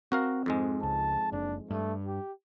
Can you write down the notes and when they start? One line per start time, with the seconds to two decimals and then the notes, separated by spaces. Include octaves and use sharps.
0.12 C4 F#4 A#4 F5
0.46 F2 G#2 G#3
0.83 C#2 A5
1.32 F#1 D4
1.70 G2 A3
2.06 G4